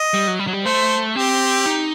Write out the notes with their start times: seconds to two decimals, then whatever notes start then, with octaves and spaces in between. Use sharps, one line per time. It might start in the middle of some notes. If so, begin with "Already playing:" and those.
Already playing: D#5
0.14 G3
0.27 F#3
0.39 G3
0.47 F#3
0.53 G3
0.65 A3 C5
1.16 C4 G4
1.66 D#4